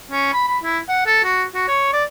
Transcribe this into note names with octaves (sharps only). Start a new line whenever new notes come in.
C#4
B5
B5
E4
F#5
A4
F#4
F#4
C#5
D5